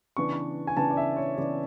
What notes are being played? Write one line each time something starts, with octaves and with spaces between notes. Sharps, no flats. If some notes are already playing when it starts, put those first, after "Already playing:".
C#3 E3 B3 D4 C#6
G#5
C#3 E3 B3 D4 A5
D5
E5
C#5
C#3 E3 B3 D4 D5